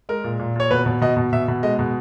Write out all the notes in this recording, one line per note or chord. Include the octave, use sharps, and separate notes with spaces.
G#3 A#4
A#2
A#2
A#2 C#5
B2 B4
B2
B2 D#5
B2
B2 E5
B2
G#3 D#5
B2